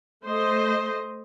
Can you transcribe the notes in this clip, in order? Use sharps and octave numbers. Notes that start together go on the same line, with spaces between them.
A3 C5 D#5